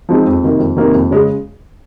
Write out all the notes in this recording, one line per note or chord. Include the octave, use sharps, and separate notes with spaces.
F3 G#3 C4 D#4
F2
C3 D#3 A#3
F2
C3 D#3 A#3
F2
C#3 G#3